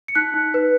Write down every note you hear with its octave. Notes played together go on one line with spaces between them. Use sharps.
C#7
D#4 F#6 B6
D#4
B4